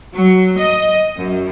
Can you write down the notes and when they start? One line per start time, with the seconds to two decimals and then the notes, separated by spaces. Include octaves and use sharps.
0.12 F#3
0.59 D#5
1.18 F#2